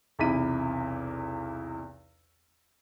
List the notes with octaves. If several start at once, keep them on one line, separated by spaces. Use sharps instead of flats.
B1 E2 C3 E4 B6 D#7